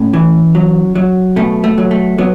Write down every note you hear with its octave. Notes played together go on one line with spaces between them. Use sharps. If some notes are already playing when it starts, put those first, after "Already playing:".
Already playing: A2 C#4
E3
F#3
F#3
B2 A3
A3
F#3
A3
F#3 B3